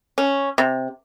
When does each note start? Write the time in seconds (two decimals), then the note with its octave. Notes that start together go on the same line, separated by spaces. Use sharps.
0.18 C#4
0.58 C3